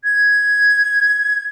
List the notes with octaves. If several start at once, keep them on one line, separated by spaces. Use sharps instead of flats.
G#6